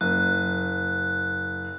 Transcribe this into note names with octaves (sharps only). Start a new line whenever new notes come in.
F#1 F#6